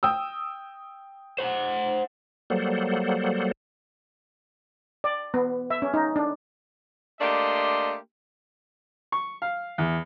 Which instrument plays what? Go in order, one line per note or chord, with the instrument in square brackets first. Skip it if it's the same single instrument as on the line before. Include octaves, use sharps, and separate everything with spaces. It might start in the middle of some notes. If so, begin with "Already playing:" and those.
[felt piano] G5 D#6 E6
[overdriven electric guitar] C5 F#5
[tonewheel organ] F#3 G3 A#3 A4 C5 F#5
[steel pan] D5
B3
E5
C#4
D#4
D4
[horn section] A3 A#3 D4 G4 D#5 C6
[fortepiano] C#6
F5
E2